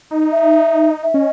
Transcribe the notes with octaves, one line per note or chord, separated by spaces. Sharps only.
D#4
E5
E5
C#4 D#5